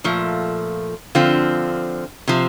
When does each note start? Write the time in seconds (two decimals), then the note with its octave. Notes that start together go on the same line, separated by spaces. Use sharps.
0.04 A#2 F3 A3
1.15 D3 F3 C4 F4
2.27 C3 F3